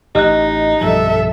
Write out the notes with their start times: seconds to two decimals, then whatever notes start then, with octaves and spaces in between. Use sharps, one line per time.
0.15 A1 D#4 G4 D#5 F#6
0.81 B1 G2 F3 A4 E5